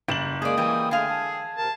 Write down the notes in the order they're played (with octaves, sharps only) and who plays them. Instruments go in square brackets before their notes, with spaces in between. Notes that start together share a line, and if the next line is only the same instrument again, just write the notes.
[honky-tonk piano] F#1 E7 F#7 [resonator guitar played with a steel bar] G3
[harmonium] G#3 A#3 [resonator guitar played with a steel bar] G#4 D5 [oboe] D#6
[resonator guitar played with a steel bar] E3 G3 [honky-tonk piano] G5 G#5
[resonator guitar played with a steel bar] D3 F5 [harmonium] G#3 A3 [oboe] G#4
[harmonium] A5
[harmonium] C3 A#4 [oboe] A5